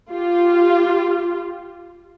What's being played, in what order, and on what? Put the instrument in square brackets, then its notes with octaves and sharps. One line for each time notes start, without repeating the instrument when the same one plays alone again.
[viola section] F4 G4